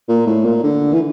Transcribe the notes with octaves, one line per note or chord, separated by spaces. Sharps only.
A#2
A2
A#2
D3
E3